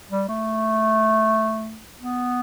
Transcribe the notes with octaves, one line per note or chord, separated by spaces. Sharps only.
G3
A3
B3